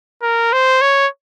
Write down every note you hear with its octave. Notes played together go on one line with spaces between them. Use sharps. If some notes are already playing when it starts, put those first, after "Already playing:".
A#4
C5
C#5